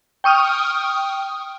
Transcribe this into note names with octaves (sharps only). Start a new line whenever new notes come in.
G5 C#6 D#6 F6